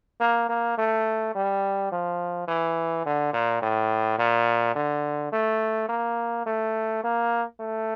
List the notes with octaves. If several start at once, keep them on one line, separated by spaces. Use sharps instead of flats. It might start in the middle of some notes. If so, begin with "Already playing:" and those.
A#3
A#3
A3
G3
F3
E3
D3
A#2
A2
A#2
D3
A3
A#3
A3
A#3
A3